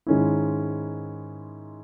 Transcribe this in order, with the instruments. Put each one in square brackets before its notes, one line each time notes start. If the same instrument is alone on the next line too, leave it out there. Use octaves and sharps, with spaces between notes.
[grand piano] G#2 D#3 G#3 C#4 E4